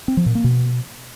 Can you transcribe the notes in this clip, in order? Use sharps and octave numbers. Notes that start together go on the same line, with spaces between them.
C4
F3
A#2
A#3
B2